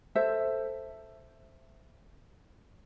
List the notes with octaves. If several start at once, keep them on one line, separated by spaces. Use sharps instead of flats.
A4 C5 E5